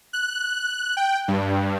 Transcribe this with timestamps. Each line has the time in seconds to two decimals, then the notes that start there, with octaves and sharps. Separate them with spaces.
0.13 F#6
0.97 G5
1.28 G2